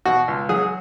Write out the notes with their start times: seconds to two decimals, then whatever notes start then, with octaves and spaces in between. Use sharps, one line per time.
0.05 B2 F#4
0.28 C#2
0.49 F#3 G#4